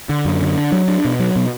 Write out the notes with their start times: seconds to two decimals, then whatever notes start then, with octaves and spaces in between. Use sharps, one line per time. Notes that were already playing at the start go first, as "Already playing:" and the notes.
0.09 D3
0.25 F#2
0.41 D3
0.58 D4
0.72 F#3
0.88 D4
1.05 B2
1.20 F#3
1.36 B2